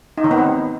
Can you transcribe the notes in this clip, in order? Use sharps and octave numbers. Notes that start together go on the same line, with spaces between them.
D#4
D#3
B3
C4